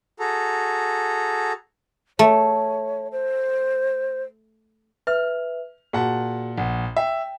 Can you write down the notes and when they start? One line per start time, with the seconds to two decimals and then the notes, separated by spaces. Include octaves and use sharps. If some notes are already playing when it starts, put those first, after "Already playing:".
0.20 F#4 G#4 A4 A#5
2.19 A3 C#5
3.12 C5
5.07 B4 E5 F6
5.93 A#2 F#4 G#4 F#5 A5
6.58 A#1 F#5
6.97 E5 G5